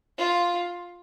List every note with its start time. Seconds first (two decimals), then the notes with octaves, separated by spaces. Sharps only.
0.18 F4